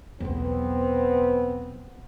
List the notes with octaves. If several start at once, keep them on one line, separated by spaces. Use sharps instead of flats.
B1 E2 B3 C4